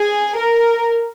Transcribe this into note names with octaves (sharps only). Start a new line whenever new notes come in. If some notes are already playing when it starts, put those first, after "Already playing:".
Already playing: G#4
A#4